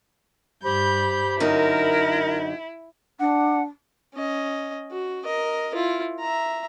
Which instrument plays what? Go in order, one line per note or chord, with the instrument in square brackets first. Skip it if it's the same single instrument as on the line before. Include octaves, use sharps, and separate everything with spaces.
[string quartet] G2 G6 [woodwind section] G4 C5 B5
[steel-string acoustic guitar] F#2 D3 D#4 [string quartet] E4 [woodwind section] A#4
[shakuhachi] D4 [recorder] F#5
[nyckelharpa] C#4 D#5
F#4
A#4 D#5
E4 F4
E5 A#5